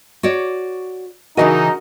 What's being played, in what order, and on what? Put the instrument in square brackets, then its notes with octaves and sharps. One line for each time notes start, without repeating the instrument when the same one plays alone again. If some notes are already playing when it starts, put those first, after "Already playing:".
[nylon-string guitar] F#4 C#5 D5
[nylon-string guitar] C#3 E3 G#5 [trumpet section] D#4 [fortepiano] F#4 A#4 D#5